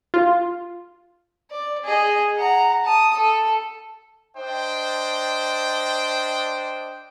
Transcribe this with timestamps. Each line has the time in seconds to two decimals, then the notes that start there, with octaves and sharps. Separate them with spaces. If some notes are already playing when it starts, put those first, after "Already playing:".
0.14 F4
1.51 D5
1.84 G#4 D#5
2.37 F#5 A#5
2.84 A5 D#6
3.15 A4
4.37 D4 C5 D#5 G5